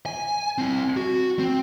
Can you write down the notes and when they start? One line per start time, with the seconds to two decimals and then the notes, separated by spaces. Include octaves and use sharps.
0.06 G#5
0.58 C4 E4
0.97 F#4
1.39 C4